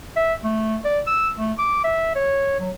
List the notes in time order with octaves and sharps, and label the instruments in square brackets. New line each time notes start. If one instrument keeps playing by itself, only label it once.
[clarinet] E5
A3
D5
E6
A3
D6
E5
C#5
F#3